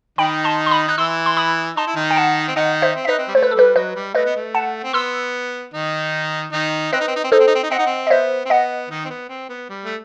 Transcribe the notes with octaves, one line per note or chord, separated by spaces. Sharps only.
D#3 D#4 G5 B5
A5 C6
C6
B5 D#6
D#4 F#6
E3 E4 C6 E6
C6
B5 D#6
D#4 A5 C6
E4
D#3 D#4
G5
F#5 A5
C4
D#3 D#4 D#5 F#5
C5 E5
C4
D#4 B4 D#5 E5
C4
G3
A3 C5
B4
A4
G3 B4
F#3 B4 D#5
G3
A3 B4 D#5
B3
A3
F#5 A5
C4
B3 C6 E6
D#3 D#4
D#3 D#4
C4 B4 D#5
D#4
C4
D#4
C4
D#4 A4 C5
C4
D#4
C4
D#4
C4 D#5 F#5
D#4
C4
D#5
B3 C5 E5
C4
B3 D#5 F#5
D#3 D#4
C4
B3
C4
B3
G3
A3